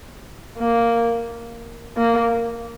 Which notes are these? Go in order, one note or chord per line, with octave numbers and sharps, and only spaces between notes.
A#3
A#3